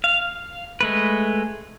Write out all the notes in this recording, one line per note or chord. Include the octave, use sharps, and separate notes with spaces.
F5
G#3 A3 B4